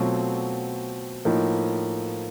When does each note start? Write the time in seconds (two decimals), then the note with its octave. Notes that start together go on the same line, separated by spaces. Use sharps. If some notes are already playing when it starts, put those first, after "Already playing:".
Already playing: B2 F#3 A3 C4 F4
1.25 A2 F3 A#3 D#4